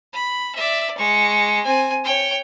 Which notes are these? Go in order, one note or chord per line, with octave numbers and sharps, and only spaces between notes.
B5
D5 E5
G#3 C#6
C4 G#5
C#5 G5